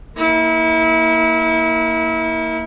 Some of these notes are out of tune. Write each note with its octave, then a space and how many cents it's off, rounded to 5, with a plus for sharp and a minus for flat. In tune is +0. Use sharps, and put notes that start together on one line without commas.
A#3 +0 E4 -30